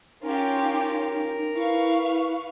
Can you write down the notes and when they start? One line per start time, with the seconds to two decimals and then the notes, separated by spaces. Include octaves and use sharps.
0.23 C#4 D#4 F4 G4 A#4
1.55 E4 B4 F5 C#6